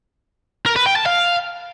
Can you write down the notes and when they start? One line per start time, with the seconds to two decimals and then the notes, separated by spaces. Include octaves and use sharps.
0.66 A#4
0.76 B4
0.86 G5
0.96 A5
1.06 F5